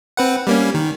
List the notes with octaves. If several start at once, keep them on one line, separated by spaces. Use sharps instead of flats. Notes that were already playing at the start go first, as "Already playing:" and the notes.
C4 B4 F#5
G3 A#3 C#4
D#3